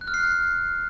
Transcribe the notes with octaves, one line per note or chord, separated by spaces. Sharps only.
F#6
F6
C7
F#6